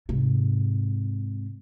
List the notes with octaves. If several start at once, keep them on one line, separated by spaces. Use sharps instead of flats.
G#2 C3